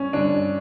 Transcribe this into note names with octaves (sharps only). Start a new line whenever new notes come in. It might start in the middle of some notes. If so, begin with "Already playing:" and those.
Already playing: G2 C#4
G2 D3 D4